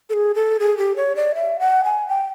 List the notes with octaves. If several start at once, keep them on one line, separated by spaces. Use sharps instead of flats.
A4
G#4
A4
G#4
G4
C#5
D5
E5
F#5
G#5
G5